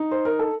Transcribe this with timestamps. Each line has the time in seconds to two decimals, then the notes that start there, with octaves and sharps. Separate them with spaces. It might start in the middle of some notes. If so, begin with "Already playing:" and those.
Already playing: D#4
0.11 C5
0.25 A#4
0.39 A4